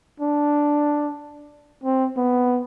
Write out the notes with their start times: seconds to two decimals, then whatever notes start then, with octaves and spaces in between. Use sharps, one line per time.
0.20 D4
1.84 C4
2.17 B3